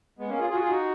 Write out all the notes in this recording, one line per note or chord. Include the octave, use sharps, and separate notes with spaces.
G#3 B3
A#3 C#4
F4 G#4
F4 G#4
F#4
F4 G#4
D#4 F#4